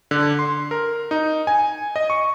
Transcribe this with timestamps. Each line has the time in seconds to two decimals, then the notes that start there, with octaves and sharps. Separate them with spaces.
0.11 D3
0.39 C6
0.71 A#4
1.11 D#4
1.47 G#5
1.96 D#5
2.10 C#6